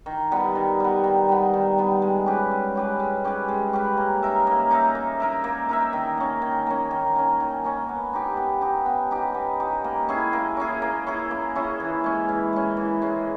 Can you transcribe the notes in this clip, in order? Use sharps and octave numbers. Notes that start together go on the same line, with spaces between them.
D#3
G3 B3
D#3
G3 B3
D#3
G3 B3
D#3
G3 B3
G#3
C#4 G4 B4
G#3
C#4 G4 B4
G#3
C#4 G4 B4
G#3
C#4 G4 B4
A#3
D#4 A#4 E5
A#3
D#4 A#4 E5
A#3
D#4 A#4 E5
A#3
D#4 A#4 E5
D#3
A#3 C#4
D#3
A#3 C#4
D#3
A#3 C#4
D#3
A#3 C#4
B3
D#4 G4
B3
D#4 G4
B3
D#4 G4
B3
D#4 G4
A#3
C#4 E4 G#4
A#3
C#4 E4 G#4
A#3
C#4 E4 G#4
A#3
C#4 E4 G#4
E3
G#3 C#4
E3
G#3 C#4
E3
G#3 C#4